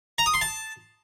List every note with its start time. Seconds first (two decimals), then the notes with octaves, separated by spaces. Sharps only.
0.18 A#5
0.26 D#6
0.34 C6
0.41 A5